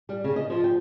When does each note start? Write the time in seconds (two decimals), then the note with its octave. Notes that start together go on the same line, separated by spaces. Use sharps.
0.09 G3
0.24 C#3
0.36 D#5
0.50 F3
0.64 G5